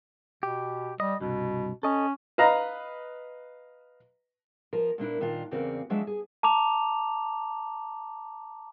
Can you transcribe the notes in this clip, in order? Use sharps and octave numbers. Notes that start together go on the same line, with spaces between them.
B2 G4
G3 D#5
C2 G2 B2
C#4 A4 D#5
B4 D#5 F5 A#5
F3 A#4
A#2 A#3 D4 E4
A#2 D#3 D4 F4
E2 C#3 A#3 C4 F#4 D5
F3 F#3 G#3 D4 D#5 E5
G#4
A5 A#5 D6 F7